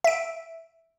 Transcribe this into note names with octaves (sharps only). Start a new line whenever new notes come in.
E5 D7